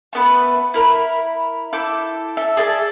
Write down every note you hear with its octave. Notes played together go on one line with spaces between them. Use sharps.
A3 B3 B4
E4 A#4 B5
E4 A4 D6 G6
A4 E5
G#4 A4 D5 E5